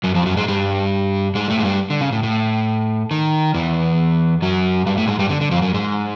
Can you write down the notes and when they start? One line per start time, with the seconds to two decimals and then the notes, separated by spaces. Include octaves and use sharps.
0.04 F#2 F#3
0.15 F2 F3
0.25 F#2 F#3
0.37 G#2 G#3
0.48 G2 G3
1.35 G#2 G#3
1.50 A2 A3
1.59 G#3
1.65 G2 G3
1.90 D3
2.01 C#3
2.12 A2
2.23 A2
3.11 D#3
3.54 E2 E3
4.42 F#2 F#3
4.86 G2 G3
4.97 A2 A3
5.08 G#2 G#3
5.19 G2 G3
5.29 D3
5.41 D3
5.51 F2 F3
5.62 F#2 F#3
5.74 G#2 G#3